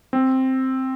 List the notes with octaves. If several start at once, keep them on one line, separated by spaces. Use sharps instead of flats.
C4